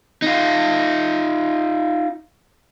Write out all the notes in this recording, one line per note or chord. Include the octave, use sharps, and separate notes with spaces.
D#4 F4